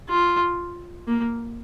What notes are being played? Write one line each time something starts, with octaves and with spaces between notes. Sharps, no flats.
F4
A#3